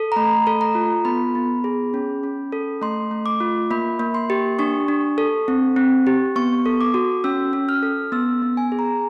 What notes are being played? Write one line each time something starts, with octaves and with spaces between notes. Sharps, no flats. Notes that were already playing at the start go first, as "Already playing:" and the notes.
Already playing: A4
A#5
A3 B5
A4
A#5
F4
B3 B5
B3
G#4
C#4
C#4
A4
A3 C6
A3
D6
F4
A#3 B5
A#3
C6
G4
D4 C#6
D4
A4
C4
C4
G4
B3 C#6
A4
D6
F#4
C#4 E6
C#4
F6
A4
B3 E6
B3
G#5
G#4
A#5